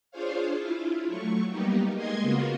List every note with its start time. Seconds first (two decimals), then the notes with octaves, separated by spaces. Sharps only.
0.11 D4 F4 G#4 C5 C#5 F5
0.57 E4 F4
1.07 F#3 A3 C#6
1.49 G3 A#3 B3 D#4 G4
1.93 G#3 A#3 D#5 C6 G#6
2.22 C#3 A#3 B3 F4 F#4